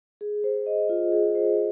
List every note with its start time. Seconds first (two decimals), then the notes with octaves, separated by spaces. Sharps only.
0.21 G#4
0.44 C5
0.66 D#5
0.89 F4
1.12 G#4
1.35 C5